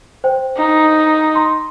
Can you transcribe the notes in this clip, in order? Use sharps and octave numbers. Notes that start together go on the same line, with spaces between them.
C5 G5
D#4
A#5 C6